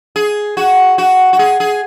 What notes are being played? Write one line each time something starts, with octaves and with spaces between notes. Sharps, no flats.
G#4
F#4
F#4
F#4
G#4
G#4